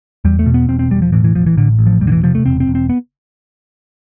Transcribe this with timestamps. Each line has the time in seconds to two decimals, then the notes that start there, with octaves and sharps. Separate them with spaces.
0.25 E2 G3
0.39 A3
0.46 B2
0.54 B3
0.68 E1 C4
0.79 C4
0.90 E1 G3
1.02 F3
1.12 A2 E3
1.24 E3
1.35 A1 F3
1.46 E3
1.57 A2 D3
1.79 A1
1.87 F3
2.01 E1 G3
2.07 D3
2.12 E3
2.23 C3 F3
2.35 A3
2.45 E1 C4
2.60 C4
2.67 E1
2.75 C4
2.89 B3